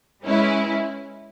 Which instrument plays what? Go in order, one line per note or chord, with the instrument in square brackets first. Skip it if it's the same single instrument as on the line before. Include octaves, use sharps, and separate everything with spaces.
[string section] G#3 C#4 E4 B4